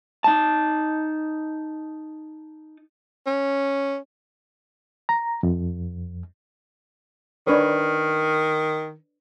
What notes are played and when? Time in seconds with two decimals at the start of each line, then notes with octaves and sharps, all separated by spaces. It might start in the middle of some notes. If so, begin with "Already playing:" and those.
0.24 D#4 A5
3.27 C#4
5.09 A#5
5.43 F2
7.47 D#3 D4 B4 C#5